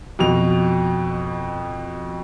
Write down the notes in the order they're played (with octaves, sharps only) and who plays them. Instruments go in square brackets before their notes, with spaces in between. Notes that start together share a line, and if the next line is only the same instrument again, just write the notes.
[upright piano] F2 B2 F7